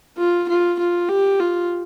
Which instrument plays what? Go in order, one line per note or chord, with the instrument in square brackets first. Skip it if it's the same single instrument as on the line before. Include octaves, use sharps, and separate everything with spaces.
[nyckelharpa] F4
F4
F4
G4
F4